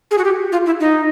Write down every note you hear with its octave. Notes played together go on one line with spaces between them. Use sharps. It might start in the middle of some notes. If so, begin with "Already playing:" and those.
G#4
F#4
G4
F4
E4
D#4